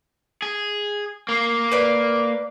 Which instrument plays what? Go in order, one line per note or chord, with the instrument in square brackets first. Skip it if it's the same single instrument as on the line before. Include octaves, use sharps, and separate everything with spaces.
[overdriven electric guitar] G#4
A#3
[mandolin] B4 D5